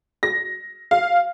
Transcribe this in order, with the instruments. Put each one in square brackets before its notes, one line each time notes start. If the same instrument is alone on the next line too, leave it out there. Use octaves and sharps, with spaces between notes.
[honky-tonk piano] A#6
F5